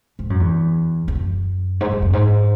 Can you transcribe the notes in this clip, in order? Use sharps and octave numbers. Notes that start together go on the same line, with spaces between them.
G#2
F#2
E2
E2
F#2
G#2
F#2
F#2
G#2